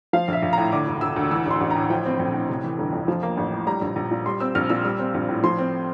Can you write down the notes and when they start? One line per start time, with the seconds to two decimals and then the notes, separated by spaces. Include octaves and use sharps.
0.13 F3 F5
0.28 A#1 E5
0.42 A#1
0.53 A2 A#5
0.72 D3 D6
0.87 E1
1.01 E1 E6
1.16 D2
1.31 E3 E6
1.46 A1 C6
1.61 A1
1.71 A2 A#5
1.90 F3 G5
2.05 C4
2.19 A#1
2.34 A2
2.49 C3
2.64 E3
2.78 G1
2.93 F2
3.08 F3
3.23 A#3
3.38 A1
3.52 A2
3.67 G3 A#5
3.81 A#1
3.96 A#1
4.11 A#2
4.26 G3 C6
4.40 C4 E6
4.55 A#1 F6
4.70 A#2 E6
4.85 G3 E6
4.99 C4
5.14 A#1
5.29 A2
5.44 F3 C6
5.58 C4